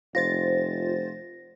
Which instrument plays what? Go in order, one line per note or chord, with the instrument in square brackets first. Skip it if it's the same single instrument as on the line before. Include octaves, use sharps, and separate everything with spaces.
[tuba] F1 [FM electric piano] F4 C5 A6 [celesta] A#6